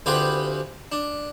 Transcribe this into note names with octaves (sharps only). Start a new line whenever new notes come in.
D2 C4 F4 G4 G#4 B4
D4